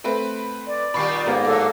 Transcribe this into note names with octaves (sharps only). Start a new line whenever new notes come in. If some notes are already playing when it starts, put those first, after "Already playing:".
A3 C4 B4
D5
A#2 D#3 G3 B5 C#6 C7
G#2 A#3 B3 G4 A#5
A2 F#3 A4 D5